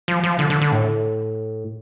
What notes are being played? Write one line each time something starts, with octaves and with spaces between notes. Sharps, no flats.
F3
F3
D3
D3
D3
A2